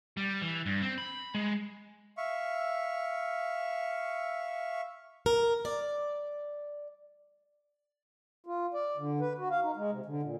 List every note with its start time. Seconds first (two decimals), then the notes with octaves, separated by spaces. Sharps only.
0.17 G3
0.42 E3
0.66 G2
0.82 C4
0.98 B5
1.35 G#3
2.17 E5 F5 C#6
5.26 A#4
5.65 D5
8.46 F4
8.74 D5
8.97 D3
9.21 B4
9.38 F#4
9.51 F5
9.62 D#4
9.77 G#3
9.92 C3
10.06 D3
10.23 A#2